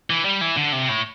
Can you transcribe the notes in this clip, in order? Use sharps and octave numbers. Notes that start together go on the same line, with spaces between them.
E3
G3
E3
D3
C3
A2